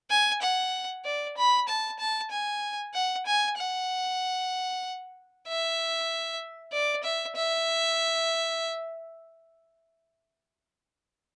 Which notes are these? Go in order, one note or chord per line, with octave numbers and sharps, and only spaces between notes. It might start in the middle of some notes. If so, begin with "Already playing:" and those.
G#5
F#5
D5
B5
A5
A5
G#5
F#5
G#5
F#5
E5
D5
E5
E5